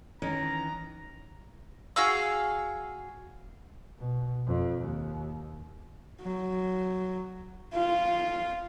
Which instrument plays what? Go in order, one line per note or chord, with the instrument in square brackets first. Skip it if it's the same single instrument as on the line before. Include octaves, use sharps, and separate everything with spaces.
[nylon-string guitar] D#3 E3 C#4 [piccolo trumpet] A#5
[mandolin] F#4 G#4 F5 E6
[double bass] B2
F2
D#2
[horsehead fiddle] F#3
F4